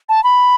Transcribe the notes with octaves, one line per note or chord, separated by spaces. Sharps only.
A5
B5